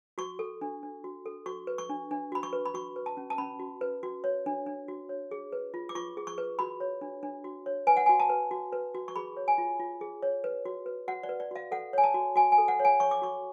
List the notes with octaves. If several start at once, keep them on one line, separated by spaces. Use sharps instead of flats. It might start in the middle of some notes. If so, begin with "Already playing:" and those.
F#4 C#6
A4
D4
D4
F#4
A4
F#4 C#6
B4
C#6
D4
D4
F#4 B5
C#6
B4
B5
F#4 C#6
B4
A5
C#4
A5
C#4 B5
F#4
B4
F#4
C#5
D4
D4
F#4
C#5
G#4
B4
F4
D6
F4 C#6
G#4
C#6
B4
F#4 B5
C#5
D4
D4
F#4
C#5
B4 G#5
F#5
F#4 G#5
A5
B4
F#4
B4
F#4
C#6
G#4 B5
C#5
G#5
F4
F4
G#4
C#5
B4
F#4
B4
F#4 F#5
D5
B4
D5
F#4 F5
A4 F#5
C#5 G#5
A5
F#4
F#4 G#5
G#5
A4
F#5
C#5
G#5
C#5 C#6
D6
F#4 C#6